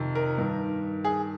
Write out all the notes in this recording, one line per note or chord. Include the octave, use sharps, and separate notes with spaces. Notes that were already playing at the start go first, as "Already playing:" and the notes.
Already playing: F2 C3 D#3
A#4
G2 D#3
G#4